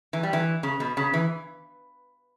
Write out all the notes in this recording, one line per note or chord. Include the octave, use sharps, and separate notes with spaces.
E3
G3
E3
C#3
B2
C#3
E3